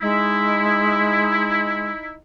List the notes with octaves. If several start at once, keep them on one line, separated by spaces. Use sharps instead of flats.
G#3 D#4 E4